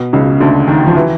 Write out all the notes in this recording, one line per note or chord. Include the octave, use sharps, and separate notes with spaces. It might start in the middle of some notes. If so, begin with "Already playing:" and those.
Already playing: B2
C#2 C#3
D2 D3
D#2 D#3
F3
E3